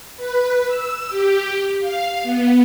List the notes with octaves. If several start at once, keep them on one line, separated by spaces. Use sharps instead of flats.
B4
E6
G4
F5
B3